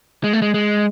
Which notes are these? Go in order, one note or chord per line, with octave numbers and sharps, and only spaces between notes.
G#3
A3
G#3
G#3